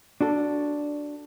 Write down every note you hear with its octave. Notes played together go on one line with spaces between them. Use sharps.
D4 F#4 A4